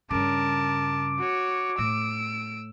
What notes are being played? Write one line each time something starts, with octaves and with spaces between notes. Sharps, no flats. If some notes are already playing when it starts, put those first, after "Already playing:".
G2 C#3 A#4 A5 D6
F#4 C#5
A2 E6 D7